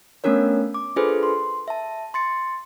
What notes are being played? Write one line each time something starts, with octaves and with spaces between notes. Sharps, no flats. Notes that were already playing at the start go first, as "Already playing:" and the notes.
A3 B3 C#4 D4 A#4 C#5
D6
D4 F4 G#4 A4 B4 C5
C6
E5 A5
C6 A6 C#7